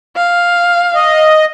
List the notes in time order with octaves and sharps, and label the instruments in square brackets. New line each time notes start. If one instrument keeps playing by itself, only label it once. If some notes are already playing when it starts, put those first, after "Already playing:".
[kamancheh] F5
[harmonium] D#5